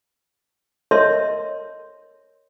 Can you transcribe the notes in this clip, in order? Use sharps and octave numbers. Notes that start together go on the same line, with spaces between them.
A#4 C#5 D#5 E5 A5 C6